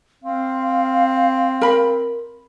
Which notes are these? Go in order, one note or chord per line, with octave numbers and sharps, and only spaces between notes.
C4 F5
A#4 B5